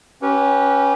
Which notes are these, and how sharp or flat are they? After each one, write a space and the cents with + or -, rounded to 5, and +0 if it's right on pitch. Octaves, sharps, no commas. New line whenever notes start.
C#4 +0 G4 -20 B4 -25